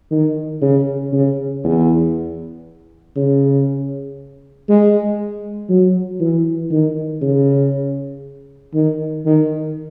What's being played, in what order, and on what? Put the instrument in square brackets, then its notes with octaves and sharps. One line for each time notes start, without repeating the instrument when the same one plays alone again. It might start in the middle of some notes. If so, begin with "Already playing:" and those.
[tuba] D#3
C#3
C#3
E2
C#3
G#3
F#3
E3
D#3
C#3
D#3
D#3